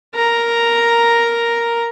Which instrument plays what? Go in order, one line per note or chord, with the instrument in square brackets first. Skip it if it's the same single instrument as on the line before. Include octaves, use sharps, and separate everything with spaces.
[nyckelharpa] A#4 A#5